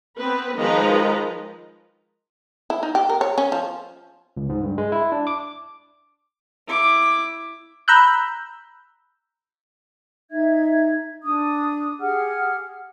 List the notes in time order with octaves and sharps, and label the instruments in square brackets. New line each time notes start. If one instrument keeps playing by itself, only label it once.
[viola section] B3 C4 B4
D#3 F3 G#3 B4 D#5 A#5
[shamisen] E4
D#4
G4
A#4
C#5
C#4
F3
[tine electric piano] C#2
G#2
G2
G#3
E4
D4
D6
[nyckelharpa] E4 D6
[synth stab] A#5 B5 E6 F#6 G6
[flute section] D#4 E5 G#6
D4 D#6
G4 G#4 F#5 F6